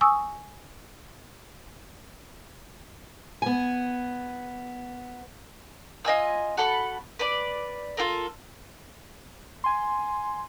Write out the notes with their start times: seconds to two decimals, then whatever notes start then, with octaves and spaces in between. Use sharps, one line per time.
0.01 G#5 C#6 D#6 E6
3.42 B3 G#5
6.05 F4 D#5 G#5 E6
6.57 F#4 A4 B5 C#6
7.19 B4 D5
7.97 F4 A4 A#4
9.64 G#5 C6